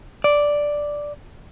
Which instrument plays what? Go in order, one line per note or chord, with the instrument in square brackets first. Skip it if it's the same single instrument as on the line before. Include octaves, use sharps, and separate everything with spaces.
[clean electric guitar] D5